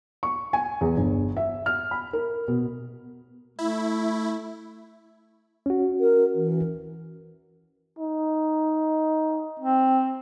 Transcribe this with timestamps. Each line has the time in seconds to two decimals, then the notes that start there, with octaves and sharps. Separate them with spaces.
0.23 C#6
0.53 G#5
0.81 E2
0.97 G1
1.37 E5
1.66 F6
1.91 B5
2.13 A#4
2.48 B2
3.59 A3 E4
5.66 C#4 F#4
6.00 A#4
6.35 E3
7.99 D#4
9.60 C4